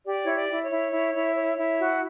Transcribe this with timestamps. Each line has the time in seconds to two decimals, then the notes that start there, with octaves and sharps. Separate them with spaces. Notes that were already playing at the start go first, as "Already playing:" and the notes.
0.06 G4 D5
0.24 E4 C#5
0.34 D5
0.49 E4
0.64 C#5
0.70 E4
0.92 E4
1.14 E4
1.36 C#5
1.58 E4
1.80 F#4